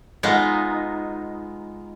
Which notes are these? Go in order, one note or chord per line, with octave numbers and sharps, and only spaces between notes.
G#3 B3 D#4 F4